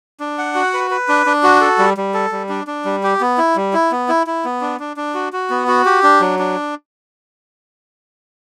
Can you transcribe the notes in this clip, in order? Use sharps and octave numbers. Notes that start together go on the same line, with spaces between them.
D4
F#5
F#4
B4
B4
D4
D4
F#4
A4
G3
G3
A4
G3
D4
D4
G3
G4
B3
E4
G3
E4
B3
E4
E4
B3
D4
D4
D4
F#4
F#4
B3
F#4
G4
D4
F#3
D4